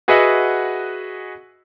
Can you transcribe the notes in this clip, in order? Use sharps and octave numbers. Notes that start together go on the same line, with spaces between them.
F#4 G#4 B4 D#5 E5 F#5